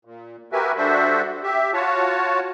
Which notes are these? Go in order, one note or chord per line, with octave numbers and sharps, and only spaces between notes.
A#2
F#4 G4 A#4 B4 E5 G#5
G3 D4 F#4 A4 C5 E5
G4 E5
F4 F#4 C#5 A5